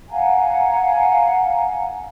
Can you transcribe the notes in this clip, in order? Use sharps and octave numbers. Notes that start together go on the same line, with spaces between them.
F5 F#5 G#5 A#5